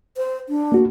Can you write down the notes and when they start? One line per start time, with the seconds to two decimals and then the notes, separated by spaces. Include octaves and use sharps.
0.17 C5
0.49 D4
0.72 A#3 F#4